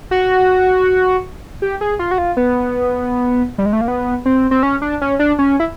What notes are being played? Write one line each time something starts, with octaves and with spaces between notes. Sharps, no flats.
F#4
G4
G#4
F4
F#4
F4
B3
G3
G#3
A3
A#3
B3
C4
C4
C#4
D4
C#4
D4
C#4
E4